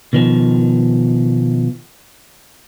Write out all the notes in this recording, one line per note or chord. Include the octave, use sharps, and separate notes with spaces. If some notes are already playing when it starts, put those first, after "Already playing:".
B2 D#3 F3